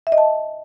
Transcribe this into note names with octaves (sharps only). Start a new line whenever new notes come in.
E5
D#5
A5